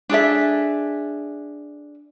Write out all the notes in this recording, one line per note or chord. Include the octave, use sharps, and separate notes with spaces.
D4 G#4 A4 E5